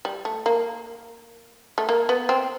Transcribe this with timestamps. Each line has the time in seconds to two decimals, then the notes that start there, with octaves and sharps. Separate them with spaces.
0.05 G3
0.25 A3
0.46 A#3
1.78 A3
1.89 A#3
2.09 B3
2.29 C4